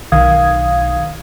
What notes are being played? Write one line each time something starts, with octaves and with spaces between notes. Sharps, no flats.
B1 D#3 F5 D#6 G#6